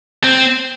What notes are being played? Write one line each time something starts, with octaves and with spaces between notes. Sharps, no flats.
C4